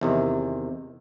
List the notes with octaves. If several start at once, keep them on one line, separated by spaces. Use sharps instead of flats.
E2 C3 D#3